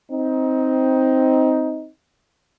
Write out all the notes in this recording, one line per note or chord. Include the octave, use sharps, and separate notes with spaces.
C4 D#4